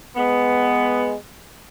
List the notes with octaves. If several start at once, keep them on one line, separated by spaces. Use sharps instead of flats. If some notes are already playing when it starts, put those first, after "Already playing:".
G#3 B3